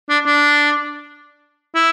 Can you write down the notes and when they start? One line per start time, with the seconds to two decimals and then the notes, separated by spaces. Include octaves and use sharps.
0.10 D4
0.26 D4
1.75 E4